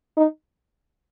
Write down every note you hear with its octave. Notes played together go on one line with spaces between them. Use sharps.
D#4